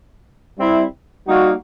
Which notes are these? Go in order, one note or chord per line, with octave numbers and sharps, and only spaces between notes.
G3 C4 E4
G3 A#3 D#4 F#4